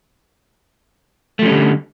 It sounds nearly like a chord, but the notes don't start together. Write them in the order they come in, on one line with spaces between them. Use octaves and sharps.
A3 F3 C#4 G3 D3